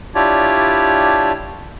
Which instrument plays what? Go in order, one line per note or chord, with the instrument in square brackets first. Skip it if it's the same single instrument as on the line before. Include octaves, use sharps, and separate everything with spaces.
[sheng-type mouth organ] D4 E4 F4 G4 C#5 D5